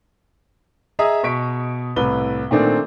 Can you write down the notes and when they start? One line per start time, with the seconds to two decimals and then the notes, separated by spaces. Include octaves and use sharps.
0.99 G#4 D#5 E5 A#5 D#6
1.23 B2 C#6 B6 D7
1.96 C2 A2 B4 G7
2.51 A#2 D#3 A3 C4 D4